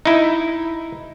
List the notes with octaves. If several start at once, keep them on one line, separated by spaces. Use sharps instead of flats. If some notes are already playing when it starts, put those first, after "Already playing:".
D#4 E4